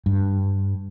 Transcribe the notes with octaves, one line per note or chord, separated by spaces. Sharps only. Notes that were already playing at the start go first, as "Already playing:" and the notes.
G2